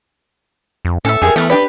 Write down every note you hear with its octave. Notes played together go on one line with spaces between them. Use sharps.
F2
A2 C#4 A4 E5
F2 G4 G#4 A#4 G#5
E3 A3 B3 E5 F5 G5
D4 G4 B4 D5 G5